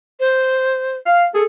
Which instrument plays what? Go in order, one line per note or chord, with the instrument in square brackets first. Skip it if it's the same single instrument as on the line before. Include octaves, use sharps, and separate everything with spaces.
[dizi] C5
[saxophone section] F5
G#4 A4